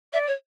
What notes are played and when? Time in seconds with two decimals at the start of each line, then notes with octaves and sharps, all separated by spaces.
0.13 D5 E5
0.27 C#5